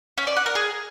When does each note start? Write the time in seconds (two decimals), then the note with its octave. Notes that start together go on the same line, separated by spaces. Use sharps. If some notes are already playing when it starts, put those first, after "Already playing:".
0.18 C#4
0.27 D5
0.36 F#5
0.46 A#4
0.55 G#4